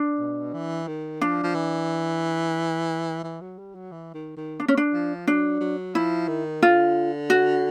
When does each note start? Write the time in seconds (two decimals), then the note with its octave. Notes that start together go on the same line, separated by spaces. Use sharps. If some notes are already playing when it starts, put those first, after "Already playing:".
Already playing: D4
0.19 B2
0.54 E3
0.88 D#3
1.21 F3 D4
1.44 F3
1.55 E3
3.24 E3
3.41 F#3
3.59 G3
3.75 F#3
3.92 E3
4.14 D#3
4.37 D#3
4.60 D4
4.68 C#4
4.77 D4
4.93 F3
5.27 F#3 D4
5.61 F#3
5.95 F3 E4
6.28 D#3
6.63 D3 F4
7.30 F#4